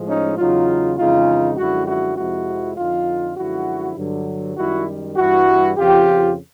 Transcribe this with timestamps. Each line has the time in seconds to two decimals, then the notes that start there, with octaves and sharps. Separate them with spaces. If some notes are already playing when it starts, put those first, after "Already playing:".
Already playing: A2 F3 G#3
0.08 C#4 D#4
0.38 E2 C#3 F#3 D#4 F4
0.97 F2 C#3 E3 G#3 D#4 F4
1.57 F#2 D3 F3 G#3 E4 F#4
1.87 E4 F#4
2.17 F2 C3 F3 G#3 E4 F#4
2.77 F2 D3 F3 D#4 F4
3.37 F#2 D3 F3 G#3 E4 F#4
3.97 G2 D3 F#3
4.57 F#2 D#3 G3 E4 F#4
5.16 G2 E3 G3 E4 F#4
5.76 F2 C#3 F3 F4 G4